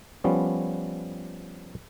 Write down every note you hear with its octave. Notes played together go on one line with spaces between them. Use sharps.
F3 G3 B3 C#4